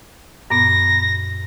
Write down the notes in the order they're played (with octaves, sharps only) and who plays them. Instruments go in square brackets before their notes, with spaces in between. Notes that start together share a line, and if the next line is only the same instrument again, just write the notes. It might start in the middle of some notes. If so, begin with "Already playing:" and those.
[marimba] F#2 A#2 B3 [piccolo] A#6